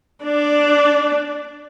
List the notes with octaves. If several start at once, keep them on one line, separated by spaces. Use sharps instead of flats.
D4 D5